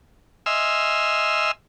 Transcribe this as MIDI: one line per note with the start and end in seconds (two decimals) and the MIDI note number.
0.46 1.51 75
0.46 1.51 76
0.46 1.51 80
0.46 1.51 84
0.46 1.51 88
0.46 1.51 89